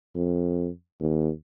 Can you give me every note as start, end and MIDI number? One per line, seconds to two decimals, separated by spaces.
0.16 0.69 41
1.00 1.30 39